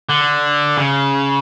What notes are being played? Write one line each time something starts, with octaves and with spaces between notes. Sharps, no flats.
D3
C#3